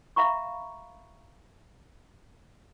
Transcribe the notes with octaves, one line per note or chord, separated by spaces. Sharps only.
E5 F5 A#5 B5 C#6